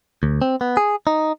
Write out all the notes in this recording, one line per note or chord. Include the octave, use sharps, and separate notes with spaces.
D2
C4
B3
G#4
D#4